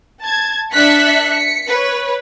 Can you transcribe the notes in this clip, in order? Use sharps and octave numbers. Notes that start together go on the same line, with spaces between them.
A5 G#6
D4 E5 F#6 B6 C#7
B6 C#7
B4 C#5